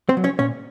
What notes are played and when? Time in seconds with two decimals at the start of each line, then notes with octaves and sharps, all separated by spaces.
0.09 C4 C5
0.17 F#3
0.24 C#4 C#5
0.39 A#2 C#4 C#5